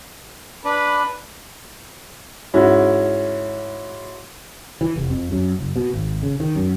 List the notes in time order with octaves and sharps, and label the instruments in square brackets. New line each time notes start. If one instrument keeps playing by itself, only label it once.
[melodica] D4 [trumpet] B4
[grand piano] G#2 C#4 E4 F#4
[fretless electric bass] E3
F1
F2
F#2
F#1
B2
G#1
C#3
D#3
F#2